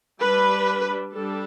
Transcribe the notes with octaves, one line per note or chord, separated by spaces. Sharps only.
G3 D4 B4
G3 D4 A4